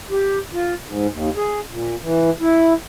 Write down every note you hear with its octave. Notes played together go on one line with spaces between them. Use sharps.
G4
F4
G#2
D#2
G#4
A#2
E3
E4